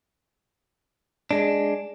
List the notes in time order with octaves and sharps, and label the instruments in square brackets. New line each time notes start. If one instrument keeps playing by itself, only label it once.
[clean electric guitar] G#3 D4